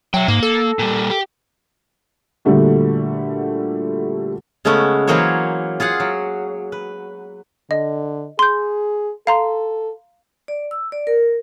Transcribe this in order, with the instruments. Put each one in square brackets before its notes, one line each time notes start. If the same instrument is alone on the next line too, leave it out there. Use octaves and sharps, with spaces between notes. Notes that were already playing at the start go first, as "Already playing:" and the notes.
[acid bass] F#3 [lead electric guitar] E5 G5
[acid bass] G#2 [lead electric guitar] A#3
[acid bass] A4
[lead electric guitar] A#2 G3
G4
[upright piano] A#2 D3 G3 A3 F#4
[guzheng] C#3 G#3 A3 B3 C#4
E3 F#3 A#3 G#4 C5 C#5
F4 G#4 F5 F#5
F#3
B4
[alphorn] D3 [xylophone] D#5
[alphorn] G#4 [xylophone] C6 G6
[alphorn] A4 [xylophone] F5 A#5 C6
[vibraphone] D5
E6
D5
A#4